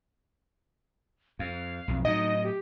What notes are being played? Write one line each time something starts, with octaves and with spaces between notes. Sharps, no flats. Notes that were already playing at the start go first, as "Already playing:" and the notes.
F2 F5
B1 F2
A2 F#3 D#4 D#5
G4